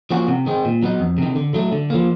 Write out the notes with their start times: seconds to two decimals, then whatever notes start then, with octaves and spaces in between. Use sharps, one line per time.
0.11 F3 A#3 C#4 F#4
0.28 C3
0.46 D#3 G#3 C4
0.65 A#2
0.83 F#3 B3 D#4
1.00 F2
1.18 C3 D#3
1.36 D3
1.54 F#3 A3
1.72 D3
1.90 F3 A#3